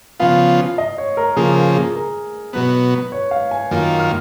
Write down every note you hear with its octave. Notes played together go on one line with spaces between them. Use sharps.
C#3 F3 B3 F4 F5
D#5
C#5
A#4
C#3 F3 A#3 G#4
A#4
G#4
A#4
B2 F#3 B3 B4
C#5
F5
G#5
F#2 D#3 A#3 F4
F6